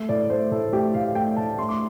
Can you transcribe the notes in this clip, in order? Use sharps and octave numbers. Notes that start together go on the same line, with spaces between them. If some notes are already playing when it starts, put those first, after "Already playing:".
Already playing: A3
A2 D5
A3 C5
A2 A4
A3 G4
A2 F5
A3 G5
A2 A5
A3 C6
D6